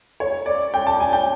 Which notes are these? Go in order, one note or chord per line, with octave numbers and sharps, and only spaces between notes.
C#5
D5
G5
A5
G#5
G5